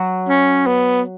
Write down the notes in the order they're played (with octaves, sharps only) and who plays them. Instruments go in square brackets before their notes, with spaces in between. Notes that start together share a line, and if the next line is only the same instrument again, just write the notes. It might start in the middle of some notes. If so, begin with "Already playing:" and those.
Already playing: [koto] F#3 F#4
[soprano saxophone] C#4
B3